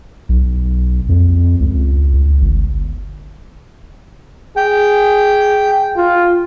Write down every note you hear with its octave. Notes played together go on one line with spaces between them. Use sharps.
B1
F2
C#2
C#2
G1
G#4 G5
F4